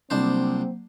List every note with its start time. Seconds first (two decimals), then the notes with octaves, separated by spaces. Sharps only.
0.10 C2 F#3 A#3 C4 D4 C5